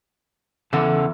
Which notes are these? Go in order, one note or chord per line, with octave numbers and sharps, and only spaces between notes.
E2 C#3 A4 F#5